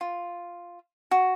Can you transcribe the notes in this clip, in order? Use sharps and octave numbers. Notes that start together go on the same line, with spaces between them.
F4
F#4